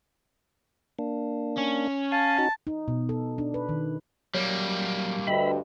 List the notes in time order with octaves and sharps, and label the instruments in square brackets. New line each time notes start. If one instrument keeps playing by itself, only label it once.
[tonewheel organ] A#3 D4
[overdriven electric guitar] C#4
[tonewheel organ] F5 G#5 [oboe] A5
[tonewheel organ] D#4 F#4
[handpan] D#4
B2
A4
D4
B4
D#3
[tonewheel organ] F#3 [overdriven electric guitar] G3 A#3
[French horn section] D2 G2 [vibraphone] D#5 G5 [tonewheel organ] E5 B5